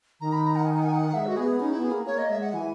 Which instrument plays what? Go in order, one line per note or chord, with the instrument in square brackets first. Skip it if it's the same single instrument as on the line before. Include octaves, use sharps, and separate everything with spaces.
[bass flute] D#3 [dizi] A#5
[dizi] B5
A#5
F#5
G#5
F#5
G#5
F#5
[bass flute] G#3 [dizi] E5
[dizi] F#4
[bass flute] B3 [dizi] G#4
[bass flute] C#4 [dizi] D#4
[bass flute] B3 [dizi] E4
[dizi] G#4
[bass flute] A#3
[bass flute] A#3 [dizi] C#5
[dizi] D#5
[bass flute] G#3 [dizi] E5
[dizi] F#5
[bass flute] E3 [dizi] G#5